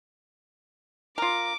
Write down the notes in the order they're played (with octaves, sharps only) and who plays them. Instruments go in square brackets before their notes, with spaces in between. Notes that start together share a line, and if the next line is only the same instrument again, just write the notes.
[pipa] F4 A#4 [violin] D6